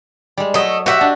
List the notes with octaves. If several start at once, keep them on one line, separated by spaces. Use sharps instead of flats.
G3 G#3
F#3 A3 D#5
F#4 G4 D#5 E5 F#5
D4